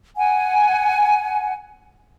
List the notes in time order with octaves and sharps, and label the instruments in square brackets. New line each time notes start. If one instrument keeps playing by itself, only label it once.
[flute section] F#5 G#5